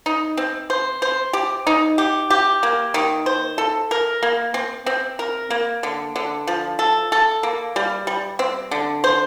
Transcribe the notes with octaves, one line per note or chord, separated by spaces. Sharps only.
D#4
C4
C5
C5
G4
D#4
G4
G4
A#3
D#3
C5
A4
A#4
A#3
C4
C4
A#4
A#3
D3
D3
F3
A4
A4
A#3
G3
G3
C4
D3
C5